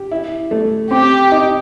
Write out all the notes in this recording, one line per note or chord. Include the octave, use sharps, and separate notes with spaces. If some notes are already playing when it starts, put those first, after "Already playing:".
Already playing: G4
E4
A3
C4 G4
D#4